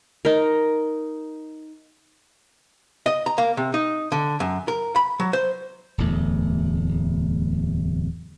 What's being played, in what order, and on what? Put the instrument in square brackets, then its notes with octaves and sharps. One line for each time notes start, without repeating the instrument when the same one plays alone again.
[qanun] D#4 A#4
[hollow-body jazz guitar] D#5
A#5
A#3
C3
D#4
D3
F#2
A#4
B5
F#3
C5
[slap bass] D1 E2 A3